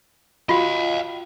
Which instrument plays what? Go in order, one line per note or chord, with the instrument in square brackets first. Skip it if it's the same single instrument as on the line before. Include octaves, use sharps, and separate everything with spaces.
[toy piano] F4 F#4 [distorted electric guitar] D#5 F5